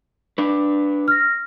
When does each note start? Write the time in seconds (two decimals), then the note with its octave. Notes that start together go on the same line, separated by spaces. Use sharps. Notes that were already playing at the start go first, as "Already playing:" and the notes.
0.38 D4 B4
1.08 F6 A#6